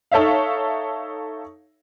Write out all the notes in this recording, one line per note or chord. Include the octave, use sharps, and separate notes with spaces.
D#4 A4 C#5 E5 F5